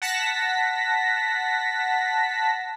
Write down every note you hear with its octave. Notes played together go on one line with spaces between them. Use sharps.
F#5 A5 A#6 B6